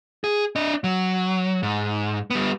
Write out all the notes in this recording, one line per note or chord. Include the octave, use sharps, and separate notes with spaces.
G#4
D4 D#5
F#3
G#2
G3 B3